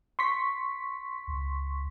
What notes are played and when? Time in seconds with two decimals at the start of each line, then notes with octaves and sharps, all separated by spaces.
0.19 C6 C#6 B6
1.27 C#2